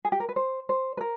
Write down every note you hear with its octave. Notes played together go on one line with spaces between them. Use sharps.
G#4
G4
A#4
B4
C5
C5
B4
A#4